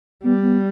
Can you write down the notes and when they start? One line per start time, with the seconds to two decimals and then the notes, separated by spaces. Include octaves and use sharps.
0.23 G3 B3
0.43 B3